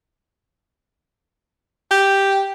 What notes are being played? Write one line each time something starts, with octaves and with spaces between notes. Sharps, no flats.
G4